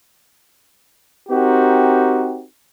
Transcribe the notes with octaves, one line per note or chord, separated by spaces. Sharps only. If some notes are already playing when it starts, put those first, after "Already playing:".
C4 D#4 F#4 G4 A#4